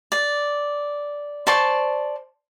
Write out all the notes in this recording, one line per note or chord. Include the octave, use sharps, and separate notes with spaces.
D5
C5 D5 A5 C#6